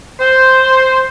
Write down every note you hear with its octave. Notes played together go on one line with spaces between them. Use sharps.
C5